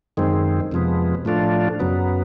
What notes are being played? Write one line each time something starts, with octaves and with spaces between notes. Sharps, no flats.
F#2 D#3 G#3 C4
F2 C3 F3 G#3 B3
A2 F3 A3 D4 F4
F#2 C#3 F#3 B3